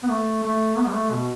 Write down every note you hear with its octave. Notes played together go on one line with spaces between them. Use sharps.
B3
A3
A3
B3
G3
A3
B2